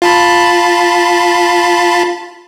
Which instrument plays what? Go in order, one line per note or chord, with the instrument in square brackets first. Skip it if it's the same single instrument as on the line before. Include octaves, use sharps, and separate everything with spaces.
[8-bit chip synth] F4 A5 B5